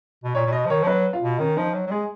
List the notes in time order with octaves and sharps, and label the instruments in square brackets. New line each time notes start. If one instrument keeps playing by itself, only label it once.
[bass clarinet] B2
[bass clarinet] A#2 [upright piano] C#5
[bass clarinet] A#2
[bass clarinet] B2 [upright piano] D#5
[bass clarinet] F3
[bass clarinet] D#3 [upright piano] C#5
[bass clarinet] F3
[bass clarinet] F#3 [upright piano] B4
[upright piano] F4
[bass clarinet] B2
[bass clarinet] D#3 [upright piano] C#4
[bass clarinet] F3 [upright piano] D#4
[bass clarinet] F#3
F#3
[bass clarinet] G#3 [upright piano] G#4